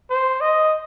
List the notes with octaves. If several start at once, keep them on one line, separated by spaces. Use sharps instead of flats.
C5
D#5